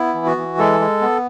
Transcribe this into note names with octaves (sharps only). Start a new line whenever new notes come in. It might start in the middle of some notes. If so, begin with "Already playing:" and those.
Already playing: B3 E4
E3
F#4
E3
G#3 A4
G#3
B3